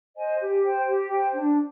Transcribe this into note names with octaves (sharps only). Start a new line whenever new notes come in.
C5 D#5 G#5
G4
C5 G5
G4
C5 G5
D4